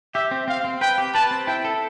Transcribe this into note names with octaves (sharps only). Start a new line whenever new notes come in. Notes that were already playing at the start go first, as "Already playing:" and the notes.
G4 E5
C4
C4 F5
C4
B4 G5
G4
B4 A5
C4
E4 G5
A4